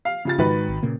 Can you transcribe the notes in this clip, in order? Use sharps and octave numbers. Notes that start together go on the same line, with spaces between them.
F5
C#3 F4 A6
G#2 D#3 F#4 B4
G#1
A#2 C#3 A#3